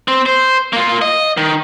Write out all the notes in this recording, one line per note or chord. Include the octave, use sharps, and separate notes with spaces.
C4
C5
A#3 F4
D#5
D#3